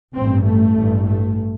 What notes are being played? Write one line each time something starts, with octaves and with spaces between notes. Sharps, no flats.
A1 G2 C4
A3
A1 G2
A3